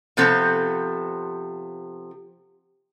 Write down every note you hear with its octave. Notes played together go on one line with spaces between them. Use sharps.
C3 F3 B3 C4 A4